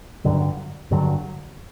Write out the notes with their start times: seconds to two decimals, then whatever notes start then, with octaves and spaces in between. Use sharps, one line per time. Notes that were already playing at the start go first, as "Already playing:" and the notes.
0.24 G2 D3 F#3
0.91 G2 D3 F#3